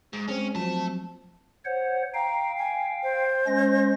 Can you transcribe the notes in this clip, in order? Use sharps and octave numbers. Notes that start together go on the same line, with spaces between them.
G#2
G#3 C4 C#4
F3 F#3 A3 C4 A5
C5 C#5 F#5
F5 G5 A#5
G#5
C5
G#3 C#4 A#6